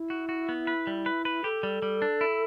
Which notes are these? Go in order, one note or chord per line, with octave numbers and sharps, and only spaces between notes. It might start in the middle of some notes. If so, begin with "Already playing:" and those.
Already playing: E4
F#4
F#4
B3
B4
G3
B4
B4
G4 A4
G3
G3
D4
E4